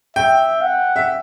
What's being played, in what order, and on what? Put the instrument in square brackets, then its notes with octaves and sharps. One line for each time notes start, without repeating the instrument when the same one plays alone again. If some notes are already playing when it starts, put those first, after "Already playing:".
[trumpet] E5 [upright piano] G5
[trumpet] F#5
[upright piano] E5